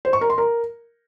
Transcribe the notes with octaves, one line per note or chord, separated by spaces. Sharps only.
C5
C#6
A#4
C6
A#4